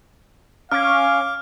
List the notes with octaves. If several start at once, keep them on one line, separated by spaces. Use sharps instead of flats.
C#4 F5 D6 F6